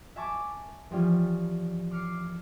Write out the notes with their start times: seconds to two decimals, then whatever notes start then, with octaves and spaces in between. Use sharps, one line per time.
0.16 E5 G#5 A5 C#6 D6 E6
0.90 E3 F3 G3 C#4 F4
1.91 D6 F6 C7 C#7